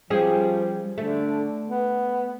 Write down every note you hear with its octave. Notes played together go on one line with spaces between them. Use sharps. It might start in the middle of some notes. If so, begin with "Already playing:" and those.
F3 G3 C#4 G#4
D3 A3
B3